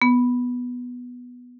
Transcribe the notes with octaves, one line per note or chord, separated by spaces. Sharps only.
B3